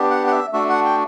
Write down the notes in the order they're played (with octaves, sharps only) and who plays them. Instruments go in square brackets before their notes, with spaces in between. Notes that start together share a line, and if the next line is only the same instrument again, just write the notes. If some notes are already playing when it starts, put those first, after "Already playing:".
Already playing: [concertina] B3 D4 G4
F#5
F#5
E5
A3 D4 F#4 E5
F#5
G5